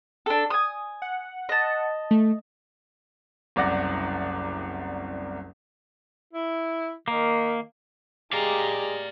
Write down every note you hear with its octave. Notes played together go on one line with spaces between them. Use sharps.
D4 A4
G#5 D#6
F#5
D#5 A5
A3
F#1 C2 D5 F#5 A#6
E4
D#3 A#3
G#3 G4 D5 F5 A#5